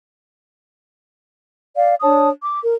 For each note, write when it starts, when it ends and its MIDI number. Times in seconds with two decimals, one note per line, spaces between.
1.76 1.96 74
1.76 1.96 77
2.02 2.28 62
2.02 2.28 73
2.02 2.28 81
2.02 2.28 87
2.42 2.60 86
2.62 2.74 70